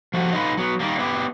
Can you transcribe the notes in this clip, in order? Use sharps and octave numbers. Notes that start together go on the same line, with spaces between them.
F3 A3 F#4 G4
D#4 F4 B4
F#3 B3
D#3 G3 A#3
B3 E4 G4